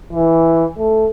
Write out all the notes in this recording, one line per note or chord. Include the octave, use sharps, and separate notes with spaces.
E3
A3